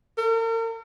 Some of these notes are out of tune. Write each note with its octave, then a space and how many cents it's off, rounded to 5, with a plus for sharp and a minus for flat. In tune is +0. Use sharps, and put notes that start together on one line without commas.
A#4 -40